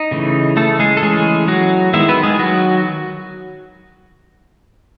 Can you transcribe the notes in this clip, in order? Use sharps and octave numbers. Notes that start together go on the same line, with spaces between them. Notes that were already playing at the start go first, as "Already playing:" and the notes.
Already playing: D#4 D#5
C#3 E3 A3
A3 A4
G#3 G#4
A4
E3 G#3 A3 C#4 G#4
F#3 F#4
D#3 G#3 B3 E4 E5
B3 B4
G#3 G#4
F#3 F#4